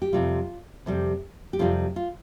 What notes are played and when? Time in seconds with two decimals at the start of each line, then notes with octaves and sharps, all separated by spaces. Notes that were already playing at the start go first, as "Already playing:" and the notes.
0.02 G4
0.13 F2 C3 G3 F4
0.86 F2 C3 G3
1.53 G4
1.59 F2 C3 G3 F4
1.96 F4